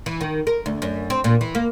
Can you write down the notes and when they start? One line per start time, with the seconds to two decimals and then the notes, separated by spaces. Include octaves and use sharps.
0.06 E3
0.21 D#3
0.47 A#4
0.66 D2
0.82 F#2
1.10 C4
1.24 A#2
1.41 E3
1.55 A#3